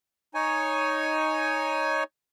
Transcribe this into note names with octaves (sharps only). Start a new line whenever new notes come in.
D#4 C#5 G#5